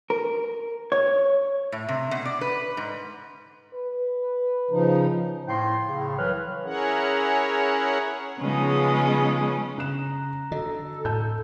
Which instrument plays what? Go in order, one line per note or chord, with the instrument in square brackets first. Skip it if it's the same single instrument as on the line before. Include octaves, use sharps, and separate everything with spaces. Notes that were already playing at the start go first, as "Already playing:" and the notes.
[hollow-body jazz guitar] A#4
C#5
[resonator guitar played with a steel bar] A2
C3
B2
D5
B4
G#2
[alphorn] B4
[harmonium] C#3 F3 D#4
[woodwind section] A2 A#3 G5 C6
A2 C#3
C2 E3 F#3 B4 C#5 F6
[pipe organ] C#4 E4 G#4 A#4 C#5 F#5
[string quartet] C#3 F3 G#3 B3 C#4 D#4
[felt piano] C#3 F#6 E7 [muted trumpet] A#5
[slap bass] D3 [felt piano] F#4 D#5 [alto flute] A4
[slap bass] A2 [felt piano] A5 G6